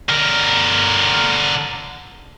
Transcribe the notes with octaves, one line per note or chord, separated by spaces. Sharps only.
D3 A#4